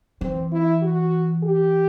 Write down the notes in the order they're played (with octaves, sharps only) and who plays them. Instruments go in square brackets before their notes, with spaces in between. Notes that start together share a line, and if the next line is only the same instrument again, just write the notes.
[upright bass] E3 [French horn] C4
[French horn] E4
F#4
G4